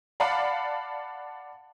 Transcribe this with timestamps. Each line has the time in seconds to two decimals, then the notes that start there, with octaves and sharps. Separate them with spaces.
0.20 D5 F5 F#5 A5 B5 D6